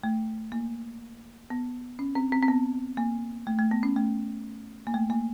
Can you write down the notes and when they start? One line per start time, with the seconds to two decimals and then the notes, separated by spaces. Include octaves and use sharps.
0.04 A3
0.52 A#3
1.50 B3
1.99 C#4
2.15 C4
2.32 C4
2.42 C4
2.48 B3
2.97 A#3
3.47 A3
3.59 A3
3.71 B3
3.83 C#4
3.96 A3
4.87 A#3
4.94 A3
5.10 A#3